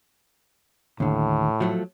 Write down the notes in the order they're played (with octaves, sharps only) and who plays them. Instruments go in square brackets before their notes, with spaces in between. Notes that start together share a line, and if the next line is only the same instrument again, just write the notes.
[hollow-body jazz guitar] D#2 D3 [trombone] A2
[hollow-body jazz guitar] F3 F#3 A3